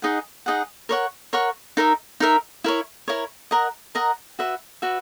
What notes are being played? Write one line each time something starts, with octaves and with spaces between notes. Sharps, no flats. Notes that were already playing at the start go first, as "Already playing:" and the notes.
D#4 G#4 D#5 F#5
D#4 G#4 D#5 F#5
A#4 C#5 F#5 C#6
A#4 C#5 F#5 C#6
D#4 A#4 E5
D#4 A#4 E5
E4 A#4 C#5
E4 A#4 C#5
A#4 D#5 F#5 A#5
A#4 D#5 F#5 A#5
F#4 B4 E5
F#4 B4 E5